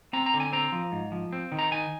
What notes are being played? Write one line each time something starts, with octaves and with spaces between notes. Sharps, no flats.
C4 A#5
A#5
D3
G#5
C4 A#5
F3
G#2
F3
C4
D#3
A#5
D#4 G#5